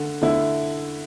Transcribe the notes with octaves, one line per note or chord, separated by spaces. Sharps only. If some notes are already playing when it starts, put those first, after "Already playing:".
Already playing: D3 A3
D3 A3 E4